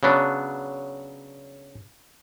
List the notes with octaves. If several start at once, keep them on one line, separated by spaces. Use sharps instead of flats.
C#3 F#3 B3 D4